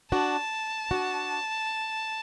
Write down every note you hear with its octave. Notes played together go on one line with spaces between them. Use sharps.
D4 F#4 A5
D4 F#4